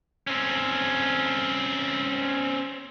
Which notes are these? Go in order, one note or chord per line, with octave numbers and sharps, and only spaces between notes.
C4 C#4